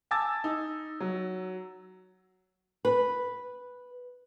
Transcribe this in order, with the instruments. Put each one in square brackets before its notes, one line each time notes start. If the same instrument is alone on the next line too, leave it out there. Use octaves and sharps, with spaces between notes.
[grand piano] G#5 A5 D6 E6 G#6 A6
D#4
F#3
[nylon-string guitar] B4